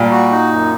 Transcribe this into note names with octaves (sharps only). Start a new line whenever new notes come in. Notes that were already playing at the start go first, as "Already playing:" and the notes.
Already playing: A#2 G3
F#4
D#4
F#2